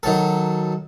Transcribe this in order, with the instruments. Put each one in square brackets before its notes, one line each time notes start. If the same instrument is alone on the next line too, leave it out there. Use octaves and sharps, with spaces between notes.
[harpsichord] D#3 F#3 A4